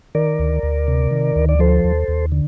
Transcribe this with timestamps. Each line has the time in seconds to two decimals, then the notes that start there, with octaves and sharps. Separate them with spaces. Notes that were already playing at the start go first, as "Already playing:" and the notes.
0.15 D#3 A#4 D5
0.39 D2
0.63 D2
0.88 C3
1.11 D#3
1.36 D2
1.49 D5
1.59 F3 A4 C5
1.84 D#2
2.08 D#2
2.32 D3